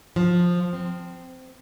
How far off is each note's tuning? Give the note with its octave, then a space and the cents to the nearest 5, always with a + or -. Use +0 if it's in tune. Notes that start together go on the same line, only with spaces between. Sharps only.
F3 +10
C4 -15